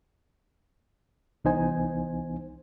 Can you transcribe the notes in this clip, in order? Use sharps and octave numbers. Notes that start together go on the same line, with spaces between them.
C2 E3 B3 D#4 C5 G#5